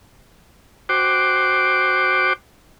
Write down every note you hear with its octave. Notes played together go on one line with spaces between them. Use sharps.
F#4 C5 G5 D6